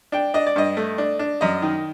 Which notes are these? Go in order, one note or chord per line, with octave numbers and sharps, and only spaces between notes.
D4 G5
D4 D#5
D5
G2 D#5
A3
D4
D4
F#2 D#5
D#3